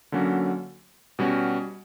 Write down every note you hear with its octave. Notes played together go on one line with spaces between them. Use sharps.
D3 F#3 A#3 C#4 F#4
B2 G3 C#4 F#4